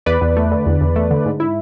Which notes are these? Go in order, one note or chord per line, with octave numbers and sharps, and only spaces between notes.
E2 B4 D5
E2
A3
D3
E2
E2
A3
D3
G#2
E4